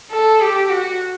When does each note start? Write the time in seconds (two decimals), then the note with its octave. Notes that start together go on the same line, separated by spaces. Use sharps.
0.11 A4
0.41 G4
0.70 F#4